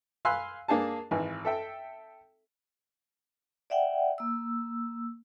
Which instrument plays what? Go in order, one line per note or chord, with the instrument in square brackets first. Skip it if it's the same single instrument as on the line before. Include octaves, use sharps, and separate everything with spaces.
[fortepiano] F5 G#5 B5 C6 E6 F#6
A#3 D4 G#4 A5
G#1 E3 G#5
A4 E5 G5
[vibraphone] D5 E5 F#5 G5
A#3 E6